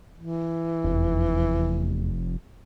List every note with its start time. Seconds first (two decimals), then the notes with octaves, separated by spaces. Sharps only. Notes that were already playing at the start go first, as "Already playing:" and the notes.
0.18 E3
0.84 F1 E2